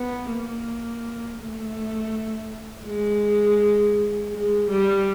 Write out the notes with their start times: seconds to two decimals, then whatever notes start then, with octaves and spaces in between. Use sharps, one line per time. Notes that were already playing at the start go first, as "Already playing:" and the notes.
Already playing: B3
0.31 A#3
1.40 A3
2.86 G#3
4.33 G#3
4.70 G3